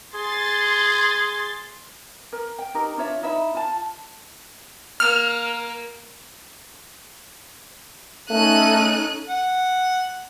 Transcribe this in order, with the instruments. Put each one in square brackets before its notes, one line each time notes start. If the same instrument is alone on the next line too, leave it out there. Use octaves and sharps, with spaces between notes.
[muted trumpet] G#4 [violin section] C6 A6
[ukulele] A#4
G5
D#4 G4 A#4
D4 F4 C#5 E5
D#4 E4 E5 B5
F4 A5
[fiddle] A#3 [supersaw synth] F6
[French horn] A3 [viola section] C#4 D#4 A4 [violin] F#6 D#7
[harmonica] F#5